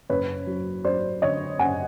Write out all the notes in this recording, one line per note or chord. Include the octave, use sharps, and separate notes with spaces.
F#1 B4 C#5
F#3
F#3 C5 D5
D3 C#5 D#5
F#1 F#5 G#5